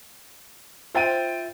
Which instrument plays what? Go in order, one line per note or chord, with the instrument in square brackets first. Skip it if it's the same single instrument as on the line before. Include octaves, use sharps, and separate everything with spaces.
[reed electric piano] F4 E5 A6 [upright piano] C5 G5 D#7